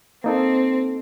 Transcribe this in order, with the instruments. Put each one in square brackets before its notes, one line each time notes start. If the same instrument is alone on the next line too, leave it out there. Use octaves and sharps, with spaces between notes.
[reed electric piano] A#3 D#4 A4 [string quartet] C4